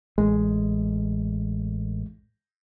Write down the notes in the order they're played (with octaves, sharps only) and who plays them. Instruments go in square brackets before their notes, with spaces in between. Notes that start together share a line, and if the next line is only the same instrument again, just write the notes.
[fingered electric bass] A1 [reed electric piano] G#3